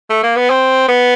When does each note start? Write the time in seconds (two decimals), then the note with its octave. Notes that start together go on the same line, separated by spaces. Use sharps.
0.10 A3
0.23 A#3
0.36 B3
0.50 C4
0.88 B3